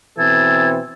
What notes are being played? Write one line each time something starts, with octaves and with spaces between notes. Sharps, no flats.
B2 E3 C4 A4 G#6